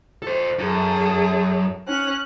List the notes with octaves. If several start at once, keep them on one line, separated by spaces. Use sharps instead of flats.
A4 C5
F#2 G#4 A4
C#4 F#6